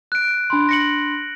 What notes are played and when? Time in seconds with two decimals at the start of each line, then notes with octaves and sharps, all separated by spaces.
0.12 F#6 D7
0.50 D4 B5 C6
0.69 A#6 C#7 F#7